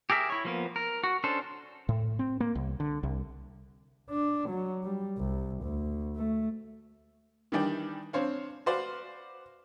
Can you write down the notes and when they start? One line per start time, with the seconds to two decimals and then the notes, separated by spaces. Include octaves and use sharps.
0.10 G4 G#4 A#4 E5
0.30 E4 C#5
0.45 F3 A#3 B3
0.76 A#4
1.04 F#4
1.24 C#4 D4 A4 C5
1.89 A2
2.19 C4
2.40 A#3
2.55 C2
2.80 D3
3.03 C2
4.10 D4
4.49 F#3
4.83 G3
5.18 C2
5.63 D2
6.16 A3
7.52 D#3 E3 G3 D4 D5 G5
8.13 C4 D4 C5 C#5 F5
8.66 F#4 B4 C5 D5 F5 F6